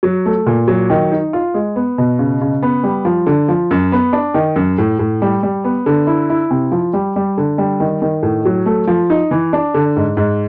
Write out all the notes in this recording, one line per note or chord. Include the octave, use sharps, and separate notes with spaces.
F#3
A3
A#2
F#3
D#3
D#4
F4
G#3
B3
B2
C#3
C#3
B3
G3
F3
D3
F3
F#2
B3
D4
D#3
F#2
A2
A2
G3
G3
B3
D3
E4
E4
C3
F3
G3
G3
D3
G3
D#3
D#3
A2
F#3
A3
F3
D#4
E3
D4
D3
G#2
G#2